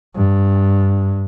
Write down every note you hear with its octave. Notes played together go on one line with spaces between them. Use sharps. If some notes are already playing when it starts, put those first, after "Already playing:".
G2